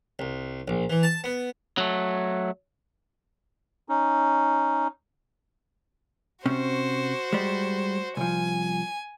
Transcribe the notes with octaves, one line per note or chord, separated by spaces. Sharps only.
C2
A#1
E3
A5
B3
F#3 A3
C#4 D#4
C3 C#4 F#4 C5
G3 G#3
C2 F3 G#5